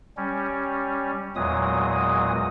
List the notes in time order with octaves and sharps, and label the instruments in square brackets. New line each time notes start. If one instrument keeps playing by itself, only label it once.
[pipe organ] G3 C#4
E2 A#2 F#3 G#3 D#6